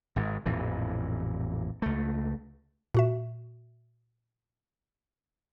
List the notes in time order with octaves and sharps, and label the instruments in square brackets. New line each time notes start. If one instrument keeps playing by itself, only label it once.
[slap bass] G#1 G#2
A1 F2 A#2 E3
C#2 A3
[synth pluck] A#2 F#4 E5